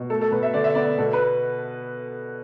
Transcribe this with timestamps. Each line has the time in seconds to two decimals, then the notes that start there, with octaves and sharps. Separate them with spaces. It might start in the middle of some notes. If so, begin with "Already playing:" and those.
Already playing: B2
0.10 A3 A4
0.21 A4
0.32 B2 B4
0.43 E5
0.54 D3 D5
0.64 E5
0.75 B3 D5
0.98 B2 A4
1.13 B4